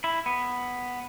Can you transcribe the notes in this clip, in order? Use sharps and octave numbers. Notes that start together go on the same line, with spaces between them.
E4
B3